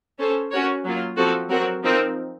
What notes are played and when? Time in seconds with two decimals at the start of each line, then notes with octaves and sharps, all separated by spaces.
0.19 C#4 A4 C5
0.51 C#4 F#4 A#4 C#5
0.85 F#3 A#3 F4
1.17 F3 C4 F#4 A4
1.50 F#3 C4 F#4 A#4
1.83 F3 C4 D#4 A#4